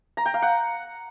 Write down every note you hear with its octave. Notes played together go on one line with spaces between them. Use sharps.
A#5
G5
F5
F#5